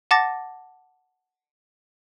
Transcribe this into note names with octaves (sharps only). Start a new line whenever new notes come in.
F#5 A5 D6 A6 A#6